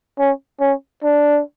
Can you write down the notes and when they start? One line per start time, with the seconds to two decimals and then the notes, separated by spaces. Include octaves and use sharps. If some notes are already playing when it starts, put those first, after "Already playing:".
0.19 C#4
0.60 C#4
1.03 D4